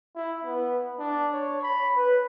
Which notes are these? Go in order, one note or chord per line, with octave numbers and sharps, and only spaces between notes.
E4
B3
D4
C#5
B5
B4